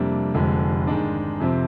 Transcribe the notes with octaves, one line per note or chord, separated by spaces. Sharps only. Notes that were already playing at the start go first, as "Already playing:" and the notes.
Already playing: F2 C3 G3 A#3 D4
F1 F2 D3 F3 G#3
G#2 D#3 G#3 D4
F2 C3 F3 C4